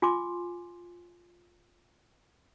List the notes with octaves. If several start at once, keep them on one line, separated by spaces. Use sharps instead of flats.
F4 G#5 C6 D6